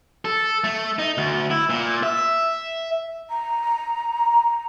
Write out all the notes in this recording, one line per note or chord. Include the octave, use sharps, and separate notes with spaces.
A4
A3
D#4
D2
E4
A#2
E5
A#5